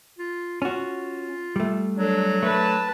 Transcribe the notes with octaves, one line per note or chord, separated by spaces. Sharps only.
F4
C#4 F4 F#4
G3 A3
F#3 D4 A4
A3 B4 A5